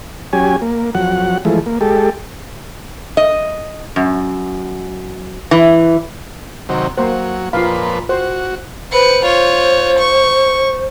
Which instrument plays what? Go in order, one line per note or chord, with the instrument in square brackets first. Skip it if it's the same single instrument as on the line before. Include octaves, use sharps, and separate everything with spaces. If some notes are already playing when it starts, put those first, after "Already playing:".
[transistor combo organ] F#3 C#4 G4 G#5
A#3
F2 F#3 F#5
E3 F3 G#3 A3
A#3
G#3 G4 A4
[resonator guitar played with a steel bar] D#5
F#2
E3
[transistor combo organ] C3 D#3 F#3
[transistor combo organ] F#3 [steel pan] A#3 C5
[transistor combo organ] F2 A#2 B4 [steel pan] F4 F5
[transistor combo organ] F#4 [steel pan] C5
[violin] B4 C#7 [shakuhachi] C5
[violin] F4 C#5
C#6